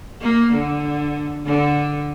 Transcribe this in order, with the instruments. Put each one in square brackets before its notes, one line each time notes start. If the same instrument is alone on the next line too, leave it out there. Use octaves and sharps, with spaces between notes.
[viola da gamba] A#3
D3
D3